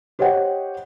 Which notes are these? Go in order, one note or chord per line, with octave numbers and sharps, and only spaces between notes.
G4 C5 C#5 D#5 F#5 G5